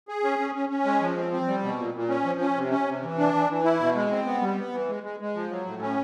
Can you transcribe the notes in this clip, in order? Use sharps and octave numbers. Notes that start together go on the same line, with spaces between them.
G#4
C#4
C#4
C#4
C#4
G#3
F3
C4
C4
G3
B2
A#2
A#2
C#4
F3
C#4
C3
C#4
C3
E3
D4
E3
E3
E4
B2
G#3
C4
B3
G3
B3
E3
G#3
G#3
G#3
F3
F#3
A2
C#4